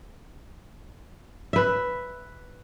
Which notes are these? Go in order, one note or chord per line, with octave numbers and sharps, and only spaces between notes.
B4 E5